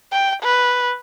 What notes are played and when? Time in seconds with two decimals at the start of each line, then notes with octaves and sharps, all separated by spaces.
0.12 G5
0.42 B4